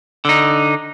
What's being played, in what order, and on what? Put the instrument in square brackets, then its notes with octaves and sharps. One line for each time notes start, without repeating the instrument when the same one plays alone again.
[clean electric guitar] D3 D#4